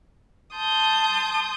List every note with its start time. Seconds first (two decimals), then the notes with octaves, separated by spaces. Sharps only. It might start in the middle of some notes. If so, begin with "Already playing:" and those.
0.55 A5 C6 D#6 G6